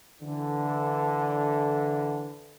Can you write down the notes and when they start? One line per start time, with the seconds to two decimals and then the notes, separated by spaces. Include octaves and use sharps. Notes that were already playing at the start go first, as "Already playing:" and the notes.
0.21 D3 E3